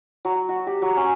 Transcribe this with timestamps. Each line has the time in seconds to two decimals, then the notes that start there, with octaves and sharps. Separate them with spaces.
0.25 F#3
0.49 F#4
0.67 G4
0.82 F#3
0.97 C#4